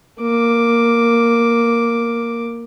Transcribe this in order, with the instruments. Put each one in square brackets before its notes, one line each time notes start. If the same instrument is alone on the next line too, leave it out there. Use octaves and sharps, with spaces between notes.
[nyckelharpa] A#3 D6